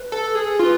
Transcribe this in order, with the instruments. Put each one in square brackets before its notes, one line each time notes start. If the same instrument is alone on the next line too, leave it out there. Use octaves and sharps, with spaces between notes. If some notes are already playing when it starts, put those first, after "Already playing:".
Already playing: [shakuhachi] B4
[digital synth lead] A4
G#4
[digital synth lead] F4 [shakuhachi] B4